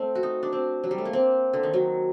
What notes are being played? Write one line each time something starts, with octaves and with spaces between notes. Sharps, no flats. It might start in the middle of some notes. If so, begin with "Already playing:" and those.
Already playing: A3 C4
F#4
D#4
D4
C4
F#3
G3
A3
A#3
C4
D3
D#3
F#3